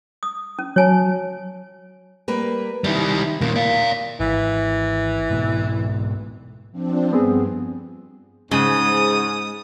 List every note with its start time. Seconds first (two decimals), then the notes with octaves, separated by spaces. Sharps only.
0.23 D#6
0.59 C#4
0.76 F#3 C#5 G#5 A5
2.28 G3 A#3 B4
2.84 D#3 G3 E4
3.41 D#2 A#2 A#3 E4
3.56 D5 F5
4.20 G#1 E3
5.30 G#2 B2
6.72 F3 C4 D4
7.13 G2 B3 C4 G#4
8.51 G#2 C#3 G#3 D#6